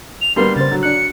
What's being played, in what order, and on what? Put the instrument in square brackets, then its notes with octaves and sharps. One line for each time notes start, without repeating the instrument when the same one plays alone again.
[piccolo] F7
[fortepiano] G3 A#3 B3 [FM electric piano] D4 [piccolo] C6
[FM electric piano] C#3 C5 [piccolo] A6
[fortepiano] D3 F#3
[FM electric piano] D4 F#6 [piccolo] C#7